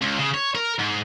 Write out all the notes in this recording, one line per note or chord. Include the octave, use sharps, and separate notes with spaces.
C#2
C#3
C#5
A#4
G#2